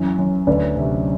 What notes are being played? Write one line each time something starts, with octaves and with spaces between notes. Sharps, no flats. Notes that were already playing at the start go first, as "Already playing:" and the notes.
Already playing: F#2 E3
F#2
D2 B4 D5
C3